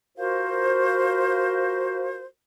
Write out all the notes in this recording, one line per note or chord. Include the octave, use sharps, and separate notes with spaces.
F4 F#4 A#4 C5